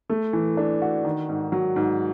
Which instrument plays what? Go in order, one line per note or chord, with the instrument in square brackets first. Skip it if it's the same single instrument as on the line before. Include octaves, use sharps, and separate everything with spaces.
[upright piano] A3
E3
D4
F#4
D#3
G#2
F#3
G#2